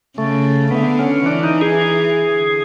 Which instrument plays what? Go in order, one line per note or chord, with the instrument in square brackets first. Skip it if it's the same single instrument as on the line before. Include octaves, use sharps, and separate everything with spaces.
[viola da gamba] C#3 [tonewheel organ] A3
[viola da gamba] D3 [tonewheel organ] B3
[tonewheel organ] C#4
[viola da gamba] E3 [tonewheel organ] D4
[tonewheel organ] D#4
G#4
[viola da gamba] D3